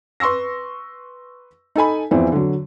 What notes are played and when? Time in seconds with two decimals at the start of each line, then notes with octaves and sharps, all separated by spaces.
0.20 B4 C6 C#6 E6 A#6
1.76 D#4 A4 G#5 B5
2.11 E2 E3 F3 B3 C4
2.32 D3 F#3